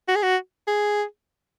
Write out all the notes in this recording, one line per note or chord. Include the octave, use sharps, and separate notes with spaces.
F#4
G#4
F#4
G#4